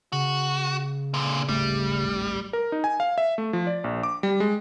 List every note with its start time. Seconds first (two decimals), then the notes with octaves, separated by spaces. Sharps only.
0.12 C#3 F#4
1.14 A#2 D3
1.49 D1 G#1 G3 A3
2.53 A#4
2.72 D#4
2.84 G#5
3.00 F5
3.18 E5
3.38 A3
3.53 F3
3.67 D5
3.84 A#1
4.03 D6
4.23 G3
4.40 G#3